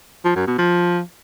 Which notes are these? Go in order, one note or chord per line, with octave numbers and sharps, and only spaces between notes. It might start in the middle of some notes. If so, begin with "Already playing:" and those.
F3
F#2
B2
F3